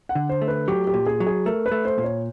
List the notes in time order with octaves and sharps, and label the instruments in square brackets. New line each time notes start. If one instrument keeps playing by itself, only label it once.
[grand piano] F#5
[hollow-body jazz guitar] D3
[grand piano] C5
[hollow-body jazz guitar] A3
[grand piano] B4
[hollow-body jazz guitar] F#3 [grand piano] G4
[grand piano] G4
[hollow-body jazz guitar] A#2
[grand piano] G#4
[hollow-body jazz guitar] F#3
[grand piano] G#4
[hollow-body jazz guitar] A3 [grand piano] A#4
[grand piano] B4
[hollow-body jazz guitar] A3
[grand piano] C5
[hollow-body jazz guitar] A#2
[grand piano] C#5